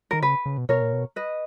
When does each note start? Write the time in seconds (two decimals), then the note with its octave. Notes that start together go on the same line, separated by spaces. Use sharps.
0.11 D#3 A#4
0.22 C#3 B4
0.46 C#3
0.58 B2
0.69 B2 A#4 C#5
0.81 A#2
0.93 B2
1.16 B4 D#5